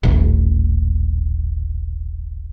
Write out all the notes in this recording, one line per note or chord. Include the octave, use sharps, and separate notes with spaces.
D#1 A1